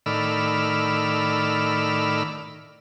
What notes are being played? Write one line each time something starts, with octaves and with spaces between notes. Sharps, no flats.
A2 D#3 D5 B5 E6 F6